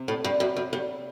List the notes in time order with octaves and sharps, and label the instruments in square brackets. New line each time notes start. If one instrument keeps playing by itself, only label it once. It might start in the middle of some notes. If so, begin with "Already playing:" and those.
Already playing: [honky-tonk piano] C3
[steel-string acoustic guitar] A2
G2
F#2
F#2
G2